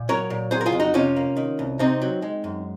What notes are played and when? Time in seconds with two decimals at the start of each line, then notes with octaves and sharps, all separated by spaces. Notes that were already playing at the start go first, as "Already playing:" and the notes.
Already playing: A#2
0.09 F#3 A#4 C#5
0.30 A#2
0.51 F#3 G#4 C5
0.61 A#4
0.66 F4 G#4
0.72 F2
0.80 D#4 F#4
0.94 C3 C#4 F4
1.16 A#3
1.37 D#3
1.59 C2
1.79 C3 C4 D#4
2.02 F#3
2.22 G#3
2.44 F#2